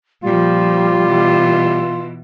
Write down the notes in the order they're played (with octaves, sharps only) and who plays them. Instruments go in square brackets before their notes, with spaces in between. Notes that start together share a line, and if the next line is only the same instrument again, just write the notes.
[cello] A#2 F3 [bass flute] G3 [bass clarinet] F4
[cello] B2 E3